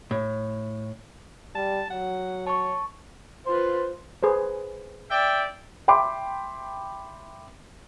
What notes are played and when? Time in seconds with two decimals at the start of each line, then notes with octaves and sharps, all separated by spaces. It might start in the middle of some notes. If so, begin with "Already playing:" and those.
0.11 A2
1.55 G3 A5
1.90 F#3 F#5
2.47 C#5 A5 C#6
3.46 F4 B4 C5
4.23 G#4 B4 C5
5.09 D5 E5 G5
5.88 E5 G5 B5 C6 D6